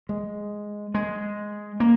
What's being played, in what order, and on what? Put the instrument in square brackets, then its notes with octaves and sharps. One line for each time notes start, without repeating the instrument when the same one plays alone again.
[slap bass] G#3
G#3
A#3